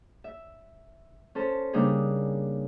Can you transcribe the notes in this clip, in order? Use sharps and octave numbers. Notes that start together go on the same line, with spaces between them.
E5
C#4 A4 C5
C#3 G3 A#3 D4 D#4 G#4